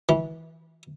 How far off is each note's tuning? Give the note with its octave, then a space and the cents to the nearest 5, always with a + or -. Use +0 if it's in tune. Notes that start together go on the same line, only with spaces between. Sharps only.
E3 -25